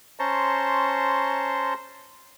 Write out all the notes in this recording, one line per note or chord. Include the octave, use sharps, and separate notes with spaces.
C#4 C5 A5 A#5 C6 C#6